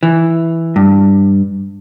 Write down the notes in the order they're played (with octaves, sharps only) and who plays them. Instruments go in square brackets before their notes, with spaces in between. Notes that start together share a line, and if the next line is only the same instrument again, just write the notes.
[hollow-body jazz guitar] E3
G2